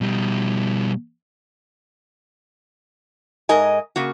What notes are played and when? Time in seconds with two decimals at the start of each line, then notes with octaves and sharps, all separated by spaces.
0.01 B2 G3
3.49 G#2 A#4 D#5 G#5
3.96 C#3 A#3 F#4